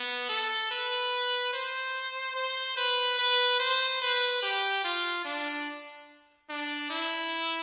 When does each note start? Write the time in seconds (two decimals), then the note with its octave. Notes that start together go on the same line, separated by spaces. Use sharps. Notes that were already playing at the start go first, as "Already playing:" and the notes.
Already playing: B3
0.29 A4
0.71 B4
1.53 C5
2.36 C5
2.77 B4
3.19 B4
3.59 C5
4.02 B4
4.43 G4
4.84 F4
5.25 D4
6.50 D4
6.90 E4